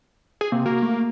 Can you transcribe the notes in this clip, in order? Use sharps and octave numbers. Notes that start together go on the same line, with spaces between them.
G#4
C3 A#3
A#3 F#4
A3